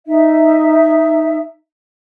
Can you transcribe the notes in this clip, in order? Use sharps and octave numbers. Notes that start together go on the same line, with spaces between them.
D#4 E5